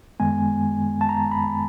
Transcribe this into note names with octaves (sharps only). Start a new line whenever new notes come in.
F#2 D#3 G#3 B3 G#5
A5
A#5
B5